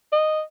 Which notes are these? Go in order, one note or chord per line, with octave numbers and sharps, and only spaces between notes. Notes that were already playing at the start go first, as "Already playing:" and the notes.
D#5